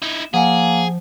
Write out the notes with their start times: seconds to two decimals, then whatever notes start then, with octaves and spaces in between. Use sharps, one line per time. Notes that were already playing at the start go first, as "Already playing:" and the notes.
0.02 D#4 E4
0.34 F3 A#3 G#4 F#5 G#5